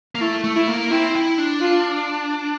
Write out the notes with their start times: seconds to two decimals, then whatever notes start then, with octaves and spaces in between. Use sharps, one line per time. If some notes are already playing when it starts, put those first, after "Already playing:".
0.15 A#3
0.21 A3 E4
0.44 A3
0.56 E4
0.68 A#3
0.91 C4 E4
1.15 E4
1.38 D4
1.61 F4